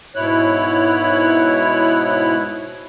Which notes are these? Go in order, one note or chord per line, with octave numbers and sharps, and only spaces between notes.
G#2 B2 E4 C#5 F#6